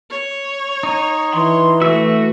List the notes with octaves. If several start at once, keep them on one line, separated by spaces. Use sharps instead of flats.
C#5
D#4
E3 C6
A3 F#4 E5